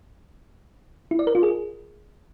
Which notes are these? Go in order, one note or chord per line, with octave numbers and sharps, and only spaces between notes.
E4
D5
A#4
F4
G#4